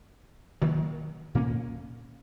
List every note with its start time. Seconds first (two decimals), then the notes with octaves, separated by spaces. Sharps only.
0.62 D#3 F#3 A#3
1.35 A#2 A#3 C#4